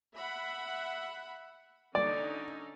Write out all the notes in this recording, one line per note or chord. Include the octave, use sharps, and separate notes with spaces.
E5 F#5 B5
D3 C#4 D#4 D5